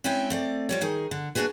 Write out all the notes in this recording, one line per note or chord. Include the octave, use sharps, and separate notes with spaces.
G#3 C4 C#4 E4 G5 G#5
A3 C4 D5
F3 G3 C#5
D#3 D#4 G#4
D3
A#3 D4 D#4 F#4 G#4 B4